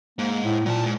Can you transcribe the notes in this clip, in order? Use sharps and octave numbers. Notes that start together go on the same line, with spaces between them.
G#2 A#3
A2
A#2 F#3 A5
F2 G#2